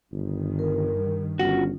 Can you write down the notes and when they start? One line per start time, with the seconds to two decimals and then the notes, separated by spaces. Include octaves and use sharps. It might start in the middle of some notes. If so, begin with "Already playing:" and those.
0.13 G1 G2 D#3
0.59 A#4
1.39 G1 C#4 F4 F#4